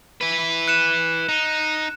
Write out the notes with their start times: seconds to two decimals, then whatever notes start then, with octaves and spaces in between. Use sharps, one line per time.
0.21 E4 B4
0.68 F#6 C#7 E7
1.29 D#4